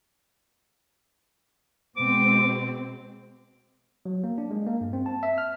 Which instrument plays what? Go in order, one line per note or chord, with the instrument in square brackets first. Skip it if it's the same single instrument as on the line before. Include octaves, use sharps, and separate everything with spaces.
[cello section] B2 G#3 C4 [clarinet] D6
[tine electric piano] F#3
A#3
D4
G#3
A#3
G2
C4
A5
E5
F6